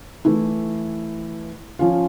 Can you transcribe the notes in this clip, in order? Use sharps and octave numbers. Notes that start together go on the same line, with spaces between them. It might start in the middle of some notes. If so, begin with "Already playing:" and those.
E3 A3 E4
F3 C#4 F4